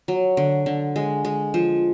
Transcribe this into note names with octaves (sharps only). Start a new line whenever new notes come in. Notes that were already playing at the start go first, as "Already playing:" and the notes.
F#3
D3
D3
G#3
G#3
F3